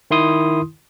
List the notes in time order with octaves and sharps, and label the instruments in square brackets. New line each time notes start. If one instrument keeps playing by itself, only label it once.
[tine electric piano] D#3 E4 C6 D#6